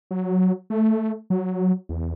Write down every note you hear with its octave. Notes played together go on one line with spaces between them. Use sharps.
F#3
A3
F#3
E2